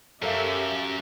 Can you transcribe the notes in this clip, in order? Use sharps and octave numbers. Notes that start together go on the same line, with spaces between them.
F#2 G4 A4 A#4 E5 F5